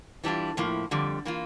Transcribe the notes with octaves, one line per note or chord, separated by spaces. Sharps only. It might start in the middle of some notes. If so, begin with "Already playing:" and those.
E3 G3 D4 F4
A2 F3 A#3 E4
F2 D3 G3
E3 A#3 F4